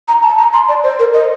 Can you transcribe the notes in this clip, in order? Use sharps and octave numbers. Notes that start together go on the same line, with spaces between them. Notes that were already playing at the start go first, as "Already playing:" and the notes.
A#5
A5
A#5
C6
D5
C5
A#4
D#5